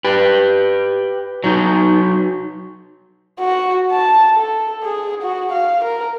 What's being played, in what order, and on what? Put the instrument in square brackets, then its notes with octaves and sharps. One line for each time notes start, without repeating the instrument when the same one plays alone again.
[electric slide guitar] G4 B4
F#3 D#4
[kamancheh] F#4
A5
A4
G#4
F#4
F5
A#4